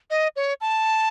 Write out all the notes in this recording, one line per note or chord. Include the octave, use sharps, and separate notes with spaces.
D#5
C#5
A5